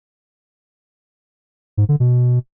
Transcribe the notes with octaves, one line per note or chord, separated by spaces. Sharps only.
G#2
D3
B2